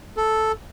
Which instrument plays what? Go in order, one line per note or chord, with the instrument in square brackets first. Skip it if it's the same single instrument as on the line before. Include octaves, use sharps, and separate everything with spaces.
[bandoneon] A4